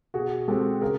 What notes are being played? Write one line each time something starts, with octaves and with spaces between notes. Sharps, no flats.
B2 F#4 G#4
G#3 C4 G4 A4
C#3 G#4 A#4